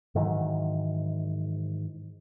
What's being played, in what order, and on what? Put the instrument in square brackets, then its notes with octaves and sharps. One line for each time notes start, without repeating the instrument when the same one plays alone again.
[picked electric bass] G#2 D#3 E3 F#3